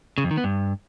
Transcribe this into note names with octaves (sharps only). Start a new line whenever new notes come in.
C#3
F2
D#3
B3
G2